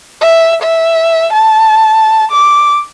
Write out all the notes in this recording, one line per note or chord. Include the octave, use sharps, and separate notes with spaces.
E5
E5
A5
D6